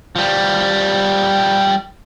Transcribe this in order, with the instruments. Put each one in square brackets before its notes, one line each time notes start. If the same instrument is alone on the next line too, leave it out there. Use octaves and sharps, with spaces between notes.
[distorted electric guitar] F3 G3